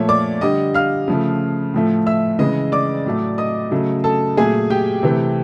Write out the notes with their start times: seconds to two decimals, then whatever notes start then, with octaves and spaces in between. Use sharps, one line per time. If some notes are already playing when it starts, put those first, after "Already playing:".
Already playing: A#2 F3 A3 C#5
0.09 D5 D6
0.41 D3 G3 D#5 D#6
0.74 F5 F6
1.08 C#3 F3 A3
1.74 A2 F3 A3
2.07 E5 E6
2.39 C#3 E3 G#3 D#5 D#6
2.72 D5 D6
3.06 A2 F#3 A3
3.38 D#5 D#6
3.71 C#3 F#3 A3
4.04 A4 A5
4.37 A#2 F#3 A3 G#4 G#5
4.70 G4 G5
5.03 C3 E3 A3